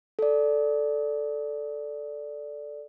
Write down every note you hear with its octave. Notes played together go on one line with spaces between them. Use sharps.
A4 D5